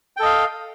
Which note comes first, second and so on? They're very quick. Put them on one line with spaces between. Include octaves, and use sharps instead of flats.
G5 A4 D#5 F5